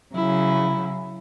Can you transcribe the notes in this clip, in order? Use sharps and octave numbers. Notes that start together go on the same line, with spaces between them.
C#3 F#3 E4